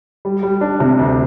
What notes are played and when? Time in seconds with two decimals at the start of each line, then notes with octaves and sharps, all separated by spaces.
0.25 G3
0.43 G3
0.61 D4
0.80 C3
0.99 D2